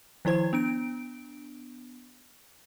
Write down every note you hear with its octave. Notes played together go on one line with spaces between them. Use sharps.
D#3 F3 E4 C5 G#6
B3 D4 D7